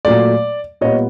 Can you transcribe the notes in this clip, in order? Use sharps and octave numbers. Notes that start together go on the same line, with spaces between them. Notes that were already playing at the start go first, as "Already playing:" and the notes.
A#2 F#3 A3 D5
A#2 G3 B3 C#5 D#5